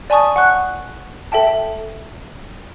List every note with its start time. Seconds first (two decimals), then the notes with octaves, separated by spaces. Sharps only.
0.10 D5 G#5 A5 C#6 D#6
0.36 F#5 C#6 F#6
1.32 A4 E5 G5 A5